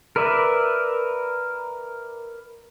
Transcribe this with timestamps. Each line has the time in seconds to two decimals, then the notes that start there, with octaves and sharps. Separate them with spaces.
0.16 A#4 B4 D5 E5